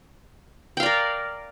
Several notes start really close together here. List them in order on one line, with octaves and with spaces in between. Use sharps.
G5 F5 D5 A#4